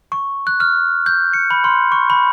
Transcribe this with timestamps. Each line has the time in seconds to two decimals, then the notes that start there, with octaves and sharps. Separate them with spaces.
0.12 C#6
0.47 F#6
0.60 F6
1.06 G6
1.33 C#7
1.51 B5
1.64 C6
1.92 C#6
2.10 B5